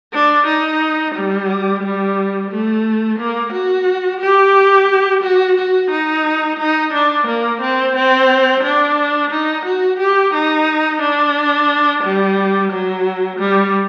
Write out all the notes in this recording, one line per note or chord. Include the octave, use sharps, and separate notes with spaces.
D4
D#4
G3
G3
A3
A#3
F#4
G4
F#4
F#4
D#4
D#4
D4
A#3
C4
C4
D4
D#4
F#4
G4
D#4
D4
G3
F#3
G3